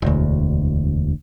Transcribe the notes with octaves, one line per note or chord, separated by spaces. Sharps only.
E1 D2